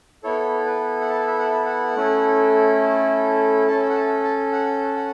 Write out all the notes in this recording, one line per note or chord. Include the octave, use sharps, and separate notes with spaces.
B3 E4 A4 C#5
B4
F#5
A5
E5
F#5
F#5
A3 C#4 E4 A4
C#4 A4 A5
F#5
A5
A5
F#5
F#5